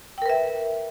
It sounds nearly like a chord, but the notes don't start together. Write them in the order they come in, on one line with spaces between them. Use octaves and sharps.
G5 A#4 B4 E5